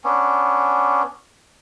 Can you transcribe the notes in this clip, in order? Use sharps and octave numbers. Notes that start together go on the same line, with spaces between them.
B3 C#4 D4